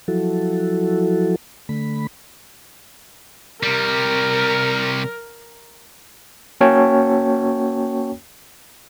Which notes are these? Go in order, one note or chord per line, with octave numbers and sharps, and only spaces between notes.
F3 F#3 E4 F#4 A4
D3 A3 B5
C3 G3 A#4
A#3 C#4 F#4 C#5 G5 A5